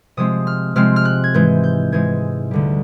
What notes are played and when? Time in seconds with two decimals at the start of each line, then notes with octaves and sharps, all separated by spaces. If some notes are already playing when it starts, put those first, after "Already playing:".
0.17 C3 F3 G#3 C4 D#6
0.47 F6
0.75 C3 F3 G#3 C4 F6
0.96 F6
1.05 F#6
1.24 G#6
1.34 G#2 E3 G#3 G6
1.63 G6
1.92 G#2 E3 G#3 G#6
2.51 D2 D3 G3